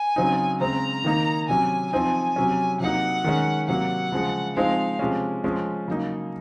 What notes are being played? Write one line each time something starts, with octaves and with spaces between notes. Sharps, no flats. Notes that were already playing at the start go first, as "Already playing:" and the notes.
Already playing: G#5
C#3 F#3 C4 D#4
C#3 G#3 C4 A#5
D#3 A#3 D#4
C3 F#3 C#4 G#5
F3 C4 D#4 G#5
C3 F#3 C#4
C3 F#3 A#3 D#4 F#5
D#3 G#3 C#4
C3 F#3 A#3 F#5
C#3 F3 G#3
F3 G#3 C4 D#4 F5
C3 F3 G#3 C#4
F3 G#3 C#4
C#3 F#3 A#3 D#4